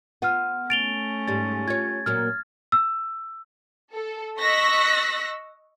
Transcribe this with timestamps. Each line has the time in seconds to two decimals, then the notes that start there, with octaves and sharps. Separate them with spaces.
0.22 B3 F4 F#5 F6
0.70 A3 C#4 A6 D7 F7 G7
1.28 G#2 G3 A6
1.68 F4 C#5 G#6
2.06 A#2 F#3 A#3 F6
2.72 E6
3.92 A4
4.40 D#5 C#6 E6 F#6 A#6 B6